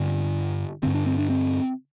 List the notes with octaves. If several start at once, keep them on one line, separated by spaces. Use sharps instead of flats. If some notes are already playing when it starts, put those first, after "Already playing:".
Already playing: G2 D3 C4
G2 D3 C4
D4
C4
D4
C4